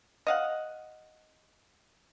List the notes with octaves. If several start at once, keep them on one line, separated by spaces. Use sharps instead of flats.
D#5 F5 F#5